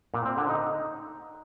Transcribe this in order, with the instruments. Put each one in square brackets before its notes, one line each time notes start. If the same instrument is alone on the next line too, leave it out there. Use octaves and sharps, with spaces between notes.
[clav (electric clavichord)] A#2
C4
D3
D#4